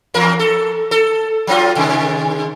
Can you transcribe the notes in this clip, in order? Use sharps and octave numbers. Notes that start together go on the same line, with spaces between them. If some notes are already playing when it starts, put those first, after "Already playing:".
E2 A#4
A4
A4
F#3 C4 F4
C3 D#3 G#3